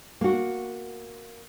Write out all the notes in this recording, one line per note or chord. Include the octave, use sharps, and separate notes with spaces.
A#3 F#4